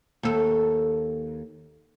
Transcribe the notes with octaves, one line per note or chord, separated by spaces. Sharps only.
D#2 A4